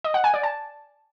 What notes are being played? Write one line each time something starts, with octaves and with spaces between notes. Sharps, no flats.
D#5
F#5
G#5
D5
A5